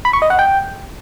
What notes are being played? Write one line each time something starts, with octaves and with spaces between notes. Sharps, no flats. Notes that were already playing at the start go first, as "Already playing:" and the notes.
B5
C#6
D#5
F#5
G5